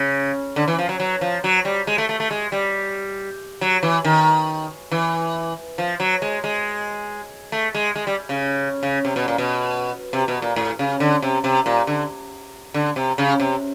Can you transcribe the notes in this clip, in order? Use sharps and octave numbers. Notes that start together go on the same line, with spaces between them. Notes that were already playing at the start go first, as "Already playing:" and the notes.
Already playing: C#3
D3
E3
F3
F#3
F#3
F3
F#3
G3
G#3
A3
A3
A3
G#3
G3
F#3
E3
D#3
E3
F3
F#3
G#3
G#3
A3
G#3
G#3
G3
C#3
C#3
C3
B2
A#2
B2
C3
B2
A#2
A2
C#3
D3
C3
C3
A#2
D3
D3
C3
C#3
C3